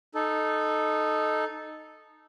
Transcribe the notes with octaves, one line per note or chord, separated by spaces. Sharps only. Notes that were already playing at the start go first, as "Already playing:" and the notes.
D#4 A4